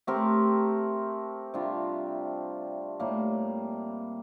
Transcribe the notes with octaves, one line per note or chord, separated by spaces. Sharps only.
A3 C4 G4 A#4
C3 G3 D4 F4
A2 G3 A#3